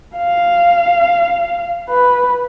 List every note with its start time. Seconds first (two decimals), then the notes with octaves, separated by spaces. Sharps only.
0.16 F5
1.89 B4